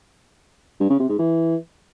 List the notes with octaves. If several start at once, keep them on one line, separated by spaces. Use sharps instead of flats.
G2
C#3
C3
G#2
E3